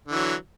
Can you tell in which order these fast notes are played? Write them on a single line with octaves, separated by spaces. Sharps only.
D3 E3 F#3